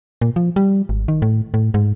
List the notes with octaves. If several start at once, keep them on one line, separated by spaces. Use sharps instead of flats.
A#2
F3
G3
G#1
D#3
A2
A2
G#2